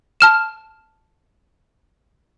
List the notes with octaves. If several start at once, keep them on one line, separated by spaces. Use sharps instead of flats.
A5 F6 E7